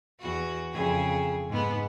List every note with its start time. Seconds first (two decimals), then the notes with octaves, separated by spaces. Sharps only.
0.20 E2 F#4
0.73 F2 C#3 G#4
1.49 G#2 B3